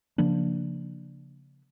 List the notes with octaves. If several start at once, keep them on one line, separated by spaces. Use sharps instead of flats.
C#3 F3 A#3 D4